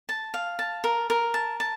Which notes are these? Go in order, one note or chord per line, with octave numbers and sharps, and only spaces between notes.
A5
F5
A5
A#4
A#4
A5
A5